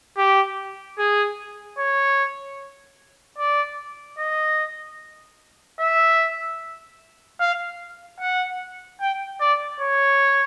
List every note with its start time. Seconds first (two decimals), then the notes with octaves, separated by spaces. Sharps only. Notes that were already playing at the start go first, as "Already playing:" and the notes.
0.17 G4
0.98 G#4
1.79 C#5
3.38 D5
4.19 D#5
5.80 E5
7.40 F5
8.20 F#5
9.01 G5
9.40 D5
9.80 C#5